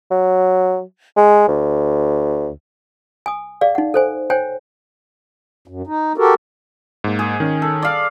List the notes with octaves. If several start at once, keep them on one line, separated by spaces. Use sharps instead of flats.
F#3
G#3
D2
G#5 D#6
G#4 D5 F5
D#4 F#5
A4 C5 G#5
C5 C#5 G5 G#5
F#2
D#4
F#4 G4 A4 A#4
G#2 A#3
G#4
D#3 C#4
A4
D5 F5